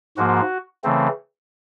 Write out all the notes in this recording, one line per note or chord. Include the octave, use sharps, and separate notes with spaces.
G#2 F3 A#3 F#4
C#3 E3 A3 C4